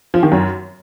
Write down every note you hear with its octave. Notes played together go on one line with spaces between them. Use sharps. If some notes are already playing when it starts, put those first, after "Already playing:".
F3
D#3
F#2